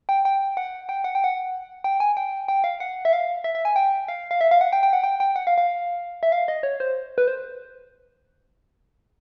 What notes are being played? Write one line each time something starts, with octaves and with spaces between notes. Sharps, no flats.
G5
G5
F#5
G5
F#5
G5
F#5
G5
G#5
G5
G5
F5
F#5
E5
F5
E5
E5
G#5
G5
F5
F5
E5
F5
F#5
G5
G5
F#5
G5
G5
F#5
F5
F5
E5
F5
D#5
C#5
C5
B4
C5